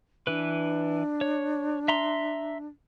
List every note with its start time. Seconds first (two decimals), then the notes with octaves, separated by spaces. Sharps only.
0.27 E3 D4 B4
1.21 C#5
1.88 E5 A#5 C6